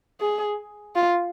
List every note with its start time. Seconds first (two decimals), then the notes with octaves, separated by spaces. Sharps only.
0.21 G#4
0.95 F4